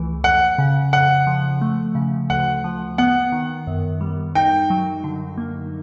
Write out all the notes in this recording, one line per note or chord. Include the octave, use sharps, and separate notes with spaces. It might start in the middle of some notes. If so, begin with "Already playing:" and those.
Already playing: C#2 E3 A3
F2 F#5
C#3
F2 F#5
F3
A3
C#3
D2 F#5
F3
B3 F#5
D#3
F#2
G3
D#4 G5
F#3
D3
A#3